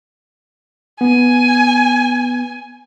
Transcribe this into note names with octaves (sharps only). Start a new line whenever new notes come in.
B3 G#5